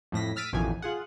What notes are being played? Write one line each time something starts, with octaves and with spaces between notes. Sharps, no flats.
F2 A2 A#6 B6
E6 F6 A6 B6 D7 D#7
A1 F2 B2 D#3 E3 G#5
F4 G#4 F#5